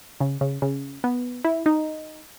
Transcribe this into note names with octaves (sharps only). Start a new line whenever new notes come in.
C#3
C#3
C#3
B3
E4
D#4